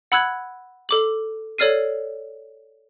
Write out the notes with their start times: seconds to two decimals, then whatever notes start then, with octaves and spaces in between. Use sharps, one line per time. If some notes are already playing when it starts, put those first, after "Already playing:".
0.12 F#5 B5 E6 F#6 G#6
0.89 A4 D6 F#7
1.58 A4 C#5 D5 F6 C7 D#7